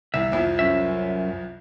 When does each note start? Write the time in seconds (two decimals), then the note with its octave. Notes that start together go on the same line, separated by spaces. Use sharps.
0.14 C2 E5
0.32 C2 F2
0.59 F#2 C#4 E5